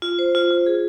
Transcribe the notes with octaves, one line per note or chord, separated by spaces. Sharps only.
F4
C5
F4
F4
G#4